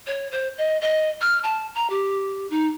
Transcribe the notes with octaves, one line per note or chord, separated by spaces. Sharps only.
C#5
C5
D#5
D#5
F6
A5
A#5
G4
D#4